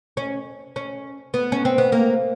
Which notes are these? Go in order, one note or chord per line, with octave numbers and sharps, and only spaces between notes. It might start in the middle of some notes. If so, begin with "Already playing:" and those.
C#4
C#4
B3
C#4
C4
B3
A#3